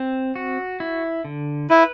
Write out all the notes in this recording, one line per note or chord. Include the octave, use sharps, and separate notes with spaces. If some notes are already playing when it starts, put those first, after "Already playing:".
Already playing: C4
F#4
E4
D3
E4 B4